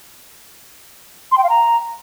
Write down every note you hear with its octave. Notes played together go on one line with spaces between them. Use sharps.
C6
G5
F5
A#5